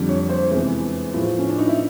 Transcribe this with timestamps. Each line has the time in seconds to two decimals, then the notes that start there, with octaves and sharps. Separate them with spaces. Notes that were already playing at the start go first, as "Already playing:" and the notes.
Already playing: F2 D3 G3
0.09 C#5
0.29 C5
0.50 E2 C3 E3 G#3 B4
1.14 A2 F3 A3
1.39 C#4
1.49 D4
1.58 D#4
1.68 E4